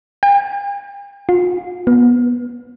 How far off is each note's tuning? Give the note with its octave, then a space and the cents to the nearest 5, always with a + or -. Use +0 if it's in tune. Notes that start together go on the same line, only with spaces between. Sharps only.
G5 +45
F4 +40
B3 -20